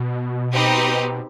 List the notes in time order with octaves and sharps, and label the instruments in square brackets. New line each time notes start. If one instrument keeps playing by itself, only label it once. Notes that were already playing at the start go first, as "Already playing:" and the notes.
Already playing: [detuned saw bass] B2
[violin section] C4 D#4 G4 B4